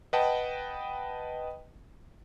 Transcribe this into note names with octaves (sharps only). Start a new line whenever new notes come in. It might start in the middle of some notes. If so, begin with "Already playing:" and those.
B4 D#5 F#5 G5 A5